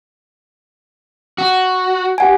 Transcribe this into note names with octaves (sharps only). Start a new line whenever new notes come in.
F#4
G4 F#5 G#5